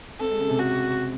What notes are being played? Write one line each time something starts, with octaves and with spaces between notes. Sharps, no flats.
C4 A4
G#3
C#3
C3
F#4